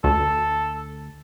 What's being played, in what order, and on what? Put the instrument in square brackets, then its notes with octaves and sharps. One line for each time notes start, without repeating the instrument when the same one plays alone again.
[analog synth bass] D2 [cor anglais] A4